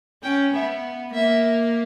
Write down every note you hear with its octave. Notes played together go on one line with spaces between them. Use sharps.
C#4 G5
B3 E5
A#3 E5